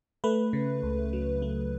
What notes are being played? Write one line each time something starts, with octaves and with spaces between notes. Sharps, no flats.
A3 B4
C#3
C#2
F#3
A3